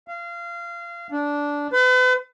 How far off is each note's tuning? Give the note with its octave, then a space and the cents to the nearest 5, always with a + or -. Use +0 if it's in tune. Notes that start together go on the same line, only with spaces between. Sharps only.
F5 -25
D4 -15
B4 +40